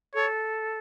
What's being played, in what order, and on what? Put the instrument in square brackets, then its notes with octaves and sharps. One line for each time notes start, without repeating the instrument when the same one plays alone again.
[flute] A4 [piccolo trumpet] C#5